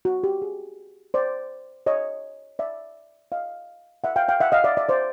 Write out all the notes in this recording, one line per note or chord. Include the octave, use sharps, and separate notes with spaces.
F#4
G4
G#4
C5 D5
C#5 D#5
D5 E5
D#5 F5
E5 F#5
F5 G5
F5 G5
E5 F#5
D#5 F5
D5 E5
D5 E5
C5 D5